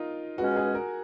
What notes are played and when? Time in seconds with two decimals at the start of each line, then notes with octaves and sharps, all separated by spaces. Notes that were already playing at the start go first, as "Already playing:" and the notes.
Already playing: D#4 F4 A#4
0.38 C#2 B2 G#3 C#4 F#4
0.56 G#4
0.74 A#4